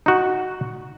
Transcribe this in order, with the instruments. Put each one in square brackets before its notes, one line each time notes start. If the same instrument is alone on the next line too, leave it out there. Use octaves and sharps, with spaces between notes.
[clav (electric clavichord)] D#4 F#4